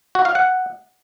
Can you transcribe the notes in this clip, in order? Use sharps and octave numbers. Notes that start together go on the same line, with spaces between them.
F#4
F5
F#5